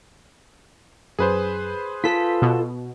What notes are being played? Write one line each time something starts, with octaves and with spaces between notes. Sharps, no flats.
F#2 G#4 B4 C5
F4 A4 B6
B2